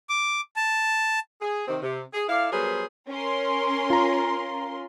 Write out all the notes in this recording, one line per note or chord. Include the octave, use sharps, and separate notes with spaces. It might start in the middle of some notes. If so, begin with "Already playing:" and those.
D6
A5
G#4
C3 D#3 C4
C3
G#4
E4 A4 D5 F5
F#3 G3 B3 G#4 A#4 C5
C#4 A#4 C6
F4 A#5